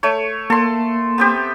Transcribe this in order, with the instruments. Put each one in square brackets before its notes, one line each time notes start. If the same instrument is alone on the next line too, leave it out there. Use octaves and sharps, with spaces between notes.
[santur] A3 C#5
[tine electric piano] A#3 [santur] A4 C6
[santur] B3 C4 G4